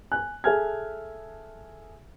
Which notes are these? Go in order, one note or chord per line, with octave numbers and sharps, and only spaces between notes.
G#5 F#6
G#4 A4 E5 G#5 F6 G#6